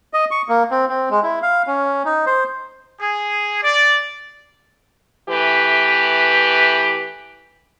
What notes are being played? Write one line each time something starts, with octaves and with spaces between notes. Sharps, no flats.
D#5
C#6
A#3
C4
C4
G#3
E4
F5
C#4
D#4
C5
G#4
D5
E3 A3 G4 B4